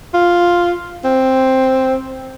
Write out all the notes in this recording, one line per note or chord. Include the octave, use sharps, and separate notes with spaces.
F4
C4